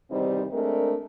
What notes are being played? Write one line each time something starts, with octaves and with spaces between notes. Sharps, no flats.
E2 C3 D#3 G3 C4 D#4
G#3 A3 C4 D4 A#4